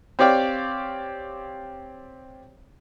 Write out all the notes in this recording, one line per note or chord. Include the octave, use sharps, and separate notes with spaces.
C4 G4 C#5 D5 F5 G5